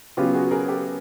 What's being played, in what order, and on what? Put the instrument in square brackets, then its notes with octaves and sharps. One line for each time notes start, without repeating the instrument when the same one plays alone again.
[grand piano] C#3 F#3 B3 [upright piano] F4 G4
[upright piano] F#4 G#4
G#4 A#4
G4 A4